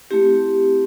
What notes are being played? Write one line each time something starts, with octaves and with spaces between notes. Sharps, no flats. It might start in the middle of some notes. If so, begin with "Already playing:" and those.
A3 C4 E4 G4